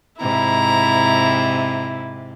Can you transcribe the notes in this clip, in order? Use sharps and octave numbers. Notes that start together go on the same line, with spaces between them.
G#2 C3 E4 A#5